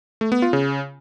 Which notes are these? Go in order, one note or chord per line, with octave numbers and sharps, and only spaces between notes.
A3
B3
F4
C#3